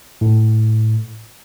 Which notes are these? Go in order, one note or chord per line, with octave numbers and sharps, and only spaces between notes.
A2